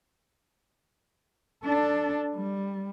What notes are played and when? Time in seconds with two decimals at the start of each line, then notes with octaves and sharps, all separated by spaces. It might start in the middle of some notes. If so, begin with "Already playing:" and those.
1.64 D4 A4
2.34 G3